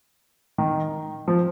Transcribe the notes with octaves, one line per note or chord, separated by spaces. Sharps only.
D#3
F3